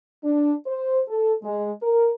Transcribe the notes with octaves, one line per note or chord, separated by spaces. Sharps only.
D4
C5
A4
G#3
A#4